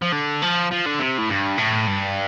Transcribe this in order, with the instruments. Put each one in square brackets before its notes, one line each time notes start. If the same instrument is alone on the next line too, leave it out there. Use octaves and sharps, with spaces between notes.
[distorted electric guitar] F3
D3
F3
F3
D3
C3
A2
G2
A2
G2